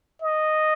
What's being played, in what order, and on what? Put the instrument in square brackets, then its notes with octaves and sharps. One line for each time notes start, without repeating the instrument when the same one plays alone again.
[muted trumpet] D#5